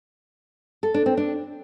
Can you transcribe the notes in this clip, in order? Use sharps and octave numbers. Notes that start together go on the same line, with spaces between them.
A4
D4
C4
D4